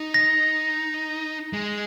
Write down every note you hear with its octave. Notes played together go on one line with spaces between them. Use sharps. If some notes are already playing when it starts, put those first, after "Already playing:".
Already playing: D#4
A#6
G#3